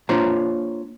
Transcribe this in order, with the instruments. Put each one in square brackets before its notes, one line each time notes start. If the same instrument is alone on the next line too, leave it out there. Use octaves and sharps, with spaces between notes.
[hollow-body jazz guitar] A#3 D4 F4 C5 C#5 A#5